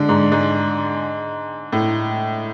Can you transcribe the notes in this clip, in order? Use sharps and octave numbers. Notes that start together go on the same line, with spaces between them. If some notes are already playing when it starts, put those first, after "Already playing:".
Already playing: D3 G#3
G#2
G#2
A2